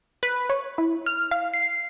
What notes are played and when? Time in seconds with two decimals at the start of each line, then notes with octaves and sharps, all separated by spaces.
0.23 B4
0.50 C#5
0.78 E4
1.06 F6
1.31 F5
1.54 C7